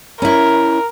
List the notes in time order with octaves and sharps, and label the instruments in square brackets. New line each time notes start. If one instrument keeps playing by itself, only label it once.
[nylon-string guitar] C#4 E4 [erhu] A#4